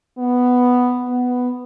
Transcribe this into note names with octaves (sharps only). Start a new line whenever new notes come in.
B3
B3